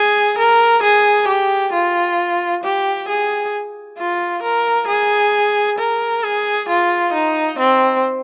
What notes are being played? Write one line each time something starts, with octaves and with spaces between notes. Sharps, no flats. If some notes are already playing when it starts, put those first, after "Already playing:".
Already playing: G#4
A#4
G#4
G4
F4
G4
G#4
F4
A#4
G#4
A#4
G#4
F4
D#4
C4